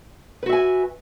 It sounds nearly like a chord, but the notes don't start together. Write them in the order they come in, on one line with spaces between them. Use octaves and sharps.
B4 F#4 E5 G#5